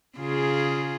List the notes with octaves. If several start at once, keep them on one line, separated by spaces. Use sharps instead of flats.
C#3 F4 G#4